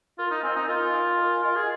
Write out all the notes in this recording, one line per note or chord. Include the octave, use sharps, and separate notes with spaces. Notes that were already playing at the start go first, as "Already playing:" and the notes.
F4 A#4
D#4
C4 D#5 G#5
D#4
F4 A#4
D#5 G#5
A#4
F4 D#5 G#5
G#4